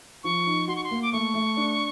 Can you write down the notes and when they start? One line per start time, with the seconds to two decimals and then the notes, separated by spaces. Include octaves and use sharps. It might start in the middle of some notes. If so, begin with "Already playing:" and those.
0.24 F3 C#6
0.47 D#4
0.68 F#4 C6
0.76 C#6
0.84 C6
0.91 A#3
1.02 D6
1.12 A3 C#6
1.34 A3
1.57 D4